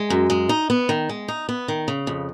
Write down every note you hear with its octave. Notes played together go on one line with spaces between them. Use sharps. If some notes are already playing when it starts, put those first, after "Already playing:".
Already playing: G#3
F#2
G#3
D#4
B3
D#3
G#3
D#4
B3
D#3
C#3
F2